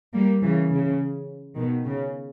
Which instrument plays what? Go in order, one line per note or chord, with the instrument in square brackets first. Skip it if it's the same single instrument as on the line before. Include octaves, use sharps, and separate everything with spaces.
[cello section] G3 A#3
C#3 E3
C#3
B2 D#3
C#3